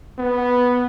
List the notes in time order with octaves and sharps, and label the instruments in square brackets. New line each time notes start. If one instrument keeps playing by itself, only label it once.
[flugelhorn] B3